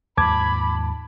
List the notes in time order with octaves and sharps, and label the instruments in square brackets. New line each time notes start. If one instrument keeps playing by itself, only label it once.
[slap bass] D#2 G#2 F3 [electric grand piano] A5 D6 G#6 [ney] B5